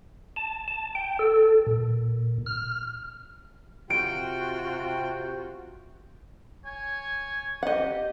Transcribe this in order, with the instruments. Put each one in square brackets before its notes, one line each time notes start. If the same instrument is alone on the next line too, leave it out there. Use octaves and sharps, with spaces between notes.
[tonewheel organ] A5
A5
G5
A4
A#2
F6
[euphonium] C3 [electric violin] F4 F#4 [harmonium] G5 [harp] D7
[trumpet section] C#5 G#5
[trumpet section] G4 [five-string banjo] D#5 F#5